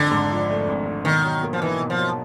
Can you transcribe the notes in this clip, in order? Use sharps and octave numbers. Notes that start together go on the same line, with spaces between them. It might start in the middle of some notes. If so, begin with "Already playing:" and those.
Already playing: G#1 F2 D3
G#2
F3
A3
G#1
G#2
B2 D#3
F#3
A#3
F3
E3 D#4
B2
F3
F#3